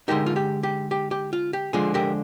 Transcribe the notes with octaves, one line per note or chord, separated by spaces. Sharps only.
D3 G#3 D#4 G4 A#4
F4
G4
G4
G4
G4
F4
G4
D3 F3 G#3 F4 G#4
G4 A#4